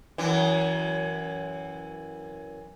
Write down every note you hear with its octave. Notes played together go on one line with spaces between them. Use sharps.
F#2 E3